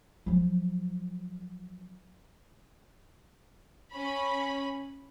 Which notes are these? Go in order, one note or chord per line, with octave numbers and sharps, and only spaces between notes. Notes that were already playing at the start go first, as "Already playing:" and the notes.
F3 F#3
C#4 B5